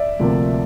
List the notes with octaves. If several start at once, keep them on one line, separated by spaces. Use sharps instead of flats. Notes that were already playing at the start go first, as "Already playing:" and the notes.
Already playing: D5 E5
D2 C3 F3 A#3